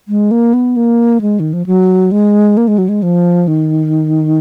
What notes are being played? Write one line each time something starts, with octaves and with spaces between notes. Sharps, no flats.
G#3
A#3
B3
A#3
G#3
D#3
F3
F#3
G#3
A#3
G#3
F#3
G#3
F3
D#3